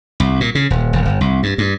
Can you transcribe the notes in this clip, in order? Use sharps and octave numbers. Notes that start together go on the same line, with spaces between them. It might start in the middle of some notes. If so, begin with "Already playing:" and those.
C2
A#2
C#3
D#1
D#1
G1
C2
G2
G2